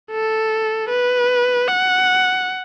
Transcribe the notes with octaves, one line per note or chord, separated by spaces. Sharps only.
A4
B4
F#5